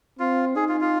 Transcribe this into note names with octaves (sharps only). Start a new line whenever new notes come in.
C4 F4
D#4 G#4
F4
F4